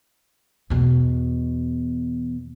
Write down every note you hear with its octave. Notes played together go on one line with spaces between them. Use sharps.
E2 B2